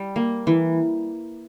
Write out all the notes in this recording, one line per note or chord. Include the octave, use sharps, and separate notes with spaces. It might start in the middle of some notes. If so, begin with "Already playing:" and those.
Already playing: G3
A#3
E3